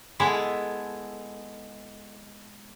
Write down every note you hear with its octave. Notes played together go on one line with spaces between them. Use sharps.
G#3 B3 E4 G#4 A4